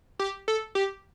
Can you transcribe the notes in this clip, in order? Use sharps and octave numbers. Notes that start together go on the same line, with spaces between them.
G4
A4
G4